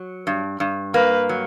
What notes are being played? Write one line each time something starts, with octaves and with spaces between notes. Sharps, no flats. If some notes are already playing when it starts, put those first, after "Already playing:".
Already playing: F#3
G2
G2
A#3 B4
F#3